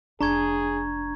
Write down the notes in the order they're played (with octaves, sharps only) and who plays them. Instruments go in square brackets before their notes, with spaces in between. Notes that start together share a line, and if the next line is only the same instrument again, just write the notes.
[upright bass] F1 [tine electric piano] D4 [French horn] G#4 [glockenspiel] A#5 C#6 G#6